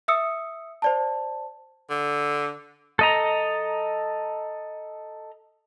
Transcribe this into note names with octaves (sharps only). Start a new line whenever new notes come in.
E5 D#6 E6 C#7
C5 D5 A5
D3
A4 D#5 A#5